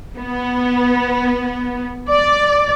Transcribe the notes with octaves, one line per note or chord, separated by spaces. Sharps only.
B3
D5